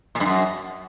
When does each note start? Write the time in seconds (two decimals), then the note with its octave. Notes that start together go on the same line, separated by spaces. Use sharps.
0.15 A#2
0.20 G2
0.25 F#2